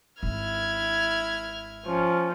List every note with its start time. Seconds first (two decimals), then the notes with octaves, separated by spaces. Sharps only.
0.23 G#1 E4 F6 G#6
1.86 F3 C#4